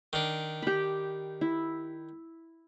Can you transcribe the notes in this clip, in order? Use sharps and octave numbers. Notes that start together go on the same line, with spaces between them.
D#3 D4
G4 B5
E4